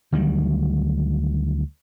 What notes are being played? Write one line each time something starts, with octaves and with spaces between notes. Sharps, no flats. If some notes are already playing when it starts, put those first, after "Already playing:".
D2 D#3 F#3 G3